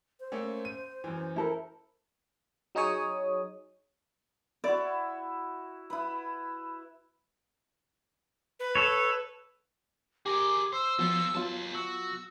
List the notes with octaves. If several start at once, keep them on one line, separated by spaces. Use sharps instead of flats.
C5
A3 A#3 C#4
D#7
F#2 E3
E4 A4 A#4
F#3 D#4 G#4 C#5 D#6
E4 F#4 D5
E4 B4
B4
A4 C#5
G4 G#4 A#4 D6
C5 C6 E6
F3 F#3 B3 F4 A4
D#2 F#3 B3 F4 A5
F#4 E6